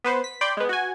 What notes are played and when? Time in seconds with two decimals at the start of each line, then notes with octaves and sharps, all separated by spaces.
0.04 B3 B4 C5
0.24 B6
0.41 D5 G5 B5 C6 G6
0.57 G#3 B3
0.69 F#4 G#5